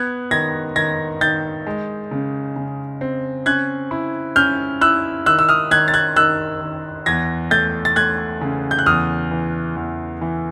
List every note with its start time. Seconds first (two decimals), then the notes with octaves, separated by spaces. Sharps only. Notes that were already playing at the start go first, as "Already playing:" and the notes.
Already playing: B3 F#6 G#6
0.31 D#3 G#6 A#6
0.76 D#3 G#6 A#6
1.21 D#3 G6 A6
1.67 G#3
2.11 C#3
2.56 C#3
3.01 C4
3.46 C#4 F#6 G#6
3.91 E4
4.36 C#4 F6 G6
4.81 E4 E6 F#6
5.26 D#3 E6 F#6
5.39 E6
5.49 D#6 F6
5.71 D#3 F#6 G#6
5.88 A6
5.94 F#6 G#6
6.16 D#3 E6 F#6
6.61 D#3
7.06 E2 G#6 A#6
7.51 A3 G6 A6
7.85 A6
7.96 A3 F#6 G#6
8.41 C#3
8.71 G6
8.79 F#6
8.86 E2 D#6 F6
9.31 E3
9.76 E2
10.21 E3